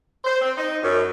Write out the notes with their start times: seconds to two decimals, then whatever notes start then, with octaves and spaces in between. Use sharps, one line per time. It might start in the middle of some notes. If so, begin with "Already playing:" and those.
0.24 C5
0.41 C4
0.57 D#4
0.82 F#2